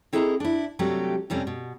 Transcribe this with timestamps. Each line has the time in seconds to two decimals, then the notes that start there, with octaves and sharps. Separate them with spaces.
0.13 C4 E4 G#4 A4 D#5 A#5
0.40 D4 E4
0.79 C3 F#3 G3 A3 D4 G4
1.30 F2 C3 G3 C#4
1.47 B2